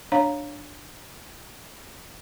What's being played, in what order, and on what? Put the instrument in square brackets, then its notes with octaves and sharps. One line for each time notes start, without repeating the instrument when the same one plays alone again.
[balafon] D4 C#5 F5 A#5